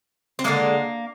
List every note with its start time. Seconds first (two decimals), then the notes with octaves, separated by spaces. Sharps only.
0.39 C4
0.44 D3 F3 G#3 A#3